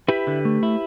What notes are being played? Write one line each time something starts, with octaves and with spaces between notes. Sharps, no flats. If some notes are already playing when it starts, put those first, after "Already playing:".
E4 G4 B4
D3
A3
E4